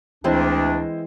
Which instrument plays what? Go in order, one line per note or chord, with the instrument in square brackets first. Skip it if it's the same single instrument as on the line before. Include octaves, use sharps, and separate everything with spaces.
[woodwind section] D2 D4 [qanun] E3 G#3 C4 [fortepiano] E4 C5 D#5